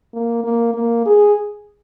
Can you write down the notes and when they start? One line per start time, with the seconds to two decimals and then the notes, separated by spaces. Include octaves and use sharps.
0.14 A#3
0.44 A#3
0.74 A#3
1.06 G#4